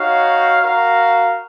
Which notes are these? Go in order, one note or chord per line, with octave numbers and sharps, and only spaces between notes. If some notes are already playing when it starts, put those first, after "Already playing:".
Already playing: D#4 F#4 C#5 F5
F#4 A#4 F5